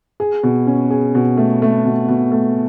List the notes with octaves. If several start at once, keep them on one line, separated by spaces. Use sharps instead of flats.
G#4
B2
C#4
G#4
B2
A3
A3
B2
B2
A3